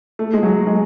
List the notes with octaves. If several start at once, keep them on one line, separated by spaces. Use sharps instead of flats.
A3
G#3
F#3
G#3